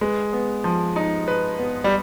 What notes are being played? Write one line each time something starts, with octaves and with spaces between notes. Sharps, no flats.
G#3 B4
B3
F3
D#4
B4
B3
G3